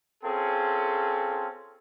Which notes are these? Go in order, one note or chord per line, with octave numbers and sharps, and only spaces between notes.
C4 C#4 F4 G#4 A4